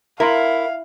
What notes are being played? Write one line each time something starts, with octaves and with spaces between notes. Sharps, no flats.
E4 A#4 F5 A#5 C6